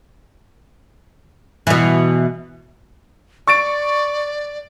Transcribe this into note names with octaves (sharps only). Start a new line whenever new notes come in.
B2 E3
D5 C#6 A6 D7